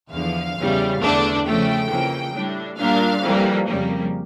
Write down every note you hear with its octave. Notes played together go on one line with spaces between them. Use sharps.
E2 D3 F3 F5
E2 C#3 G3
E2 D3 A3 D4
C#3 F3 A3 G5
F2 C#3 E3 A#3
A2 G3 D4
A#2 G3 D4 F5
F2 E3 G3 A#3
F2 C#3 G3 A#3